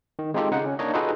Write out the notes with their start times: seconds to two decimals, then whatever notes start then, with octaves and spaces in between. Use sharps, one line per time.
0.19 D#3
0.34 G#3 C4 D#4 F4 G4 A4
0.52 C#3 D#4 F#5
0.65 C#4
0.79 A#3 D4 D#4 C#5 D#5
0.94 D#4 F4 F#4 G#4 A4 B4